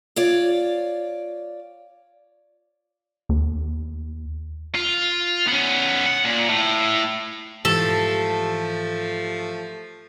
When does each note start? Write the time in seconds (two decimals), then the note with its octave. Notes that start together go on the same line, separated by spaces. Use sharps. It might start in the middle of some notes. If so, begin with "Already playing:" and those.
0.16 F4 C#5 D5
3.29 D#2
4.75 F4
5.47 B3 C#4
6.07 F#5
6.25 A#2
6.49 A2
7.65 G#2 E3 F3 A3 G4 A4